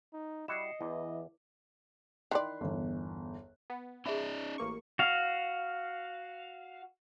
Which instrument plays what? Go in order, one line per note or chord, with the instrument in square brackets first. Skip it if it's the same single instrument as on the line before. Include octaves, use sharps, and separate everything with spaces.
[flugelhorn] D#4
[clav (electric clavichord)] G3 E4 F#4 [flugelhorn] D#5 [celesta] C7 C#7 E7
[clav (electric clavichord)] E2 [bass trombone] E3 [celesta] E4 D6
[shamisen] D#3 E3 D5 [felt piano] B5 C6 F#6
[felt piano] G1 E2
[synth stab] B3
[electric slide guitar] C#4 D#4 D5 [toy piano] G#4 E5 B5
[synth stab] A1 A#3 C#6
[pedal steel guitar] F#4 F5